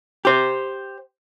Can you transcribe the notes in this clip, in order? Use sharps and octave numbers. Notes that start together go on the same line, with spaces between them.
G4 C5